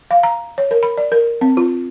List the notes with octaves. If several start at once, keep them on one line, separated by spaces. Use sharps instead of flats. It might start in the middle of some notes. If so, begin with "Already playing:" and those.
F5
A#5
C#5
A#4
B5
D5
A#4
C4
F4